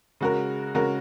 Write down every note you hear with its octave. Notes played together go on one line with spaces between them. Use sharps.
C#3 G#3 F#4 A#4
C#3 G#3 F#4 A#4